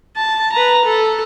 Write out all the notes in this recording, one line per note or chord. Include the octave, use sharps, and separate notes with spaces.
A5
B4 A#5
A4